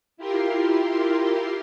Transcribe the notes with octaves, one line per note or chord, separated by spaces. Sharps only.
E4 F4 G4 A#4 C6